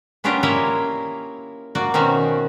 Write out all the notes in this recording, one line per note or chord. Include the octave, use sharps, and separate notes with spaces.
B3 C#4 D4 F4 G4 A#4
A#3 E4 F4 C#5 D#5 E5
A#3 F#4 D5
B2 D#3 C4 C#4 F#4